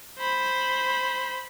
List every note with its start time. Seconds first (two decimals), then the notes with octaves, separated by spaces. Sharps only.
0.19 C5 B5